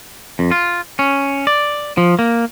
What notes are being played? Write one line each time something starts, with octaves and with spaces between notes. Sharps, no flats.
F2
F4
C#4
D5
F3
A#3